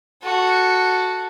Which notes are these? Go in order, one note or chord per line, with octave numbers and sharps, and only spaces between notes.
F#4 A4